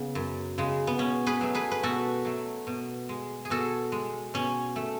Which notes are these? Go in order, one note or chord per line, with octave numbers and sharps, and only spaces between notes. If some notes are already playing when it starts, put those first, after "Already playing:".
Already playing: C#3 B3
F#2
C#3 G#3
B3
B2 C#4
G#4 B4
F#3 A3
G#4 B4
B4
B2 F#4 A4
F#3 A3
B2
G#3
G#4
B2 F#4 A4
G#3
B2 C#4
A3